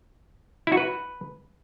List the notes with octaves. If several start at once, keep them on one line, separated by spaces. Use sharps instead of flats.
E4
F#4
B4